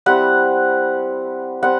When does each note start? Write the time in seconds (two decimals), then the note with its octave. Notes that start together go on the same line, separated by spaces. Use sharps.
0.06 G3 C4 E4 F#5
1.62 G3 C4 F#5